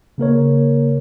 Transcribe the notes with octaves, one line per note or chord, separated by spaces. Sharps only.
C#3 A#3 A#4 C#5